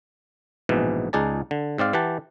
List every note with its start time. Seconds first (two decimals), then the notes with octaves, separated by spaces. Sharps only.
0.69 A#1 G#2 B2 E3
1.13 C#2 D#4 G#4 D5 A5
1.51 D3
1.78 G#2 C4 D5 F5
1.93 E3 G4 F#5 A5